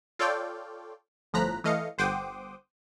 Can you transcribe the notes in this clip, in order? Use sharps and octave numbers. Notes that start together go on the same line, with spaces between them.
F4 A4 C#5 D5 F5 G5
G1 A2 F3 A#5 F#6 B6
E3 A3 D#5 F5 C#7
G1 C5 F#5 G5 D6 D#6